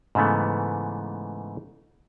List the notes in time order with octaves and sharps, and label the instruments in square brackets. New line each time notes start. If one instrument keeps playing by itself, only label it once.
[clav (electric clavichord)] G#2 C#3 E3 A3 B3